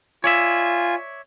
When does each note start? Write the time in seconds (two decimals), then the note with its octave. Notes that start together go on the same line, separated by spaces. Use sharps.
0.24 F4 C#5 D5 E5 G#5